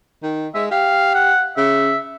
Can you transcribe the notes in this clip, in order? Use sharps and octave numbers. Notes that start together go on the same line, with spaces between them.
D#3
G#3 E5
G4 F5
F#5
C#3 E5